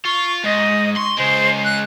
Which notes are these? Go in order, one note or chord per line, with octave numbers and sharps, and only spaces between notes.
F4 C#6
G#2 D#5
C6 C#6
C#3 G#3 C5
F#6